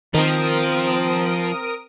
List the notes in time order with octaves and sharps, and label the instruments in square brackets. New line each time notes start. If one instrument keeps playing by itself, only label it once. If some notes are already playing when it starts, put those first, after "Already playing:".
[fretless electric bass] D#3 [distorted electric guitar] F3 [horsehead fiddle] C4 [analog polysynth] A#4 D#6 D7